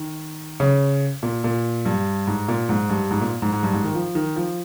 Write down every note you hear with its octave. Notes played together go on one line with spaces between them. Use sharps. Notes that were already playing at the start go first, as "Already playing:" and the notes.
Already playing: D#3
C#3
A#2
A#2
G2
G#2
A#2
G#2
G2
G#2
A#2
G#2
G#2
G2
G#2
D#3
F3
D#3
F3